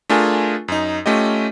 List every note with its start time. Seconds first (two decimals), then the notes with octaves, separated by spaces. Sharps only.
0.10 A3 D4 F4 G#4 A#4 G#5
0.68 F#2 D#4
1.06 A3 C#4 F4 G4 D#5